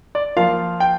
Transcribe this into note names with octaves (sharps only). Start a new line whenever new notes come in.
D5
F3 A#3 F4 F5
G5